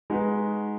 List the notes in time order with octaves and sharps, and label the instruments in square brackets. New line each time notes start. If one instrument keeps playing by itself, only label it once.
[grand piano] G#3 D#4 F#4 B4